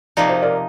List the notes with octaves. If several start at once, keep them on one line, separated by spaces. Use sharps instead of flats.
C3 F3 A#3 D#4 D5
C5
A#4 D5